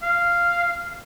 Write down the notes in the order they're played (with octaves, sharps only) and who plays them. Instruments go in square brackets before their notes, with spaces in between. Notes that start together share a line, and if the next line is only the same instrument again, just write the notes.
[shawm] F5